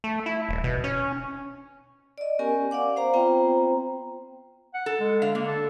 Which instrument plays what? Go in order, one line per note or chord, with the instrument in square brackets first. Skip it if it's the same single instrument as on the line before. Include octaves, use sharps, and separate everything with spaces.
[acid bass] A3
E4
D#1
B2
C#4
[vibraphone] D5 D#5
B3 C#4 G4 A#4 G#5 C#6
D5 F5 F#5 D6
C5 F5 A#5
B3 C4 F4 C5 G5 A#5
[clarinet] F#5
[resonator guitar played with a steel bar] A4
[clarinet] G#3
[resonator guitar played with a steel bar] D3 F5
[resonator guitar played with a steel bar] D3 [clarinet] A#3
[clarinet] A4